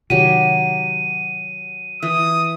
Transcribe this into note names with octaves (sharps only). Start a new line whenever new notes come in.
C3 D#3 F#3 G4 D#7
E3 D#6